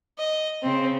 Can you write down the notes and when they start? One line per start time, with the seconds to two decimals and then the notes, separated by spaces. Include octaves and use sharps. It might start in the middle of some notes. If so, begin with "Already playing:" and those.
0.19 D#5
0.63 C#3 C4